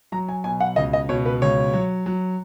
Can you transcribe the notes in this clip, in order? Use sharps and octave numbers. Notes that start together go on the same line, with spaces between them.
F#3 A#5
G#5
B2 G#5
F#5
C#2 D#5
D#5
B2 C#5
B4
C#2 C#5
F#3
F#3